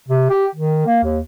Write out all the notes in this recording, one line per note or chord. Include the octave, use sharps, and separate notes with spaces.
C3
G4
D#3
A#3
D#2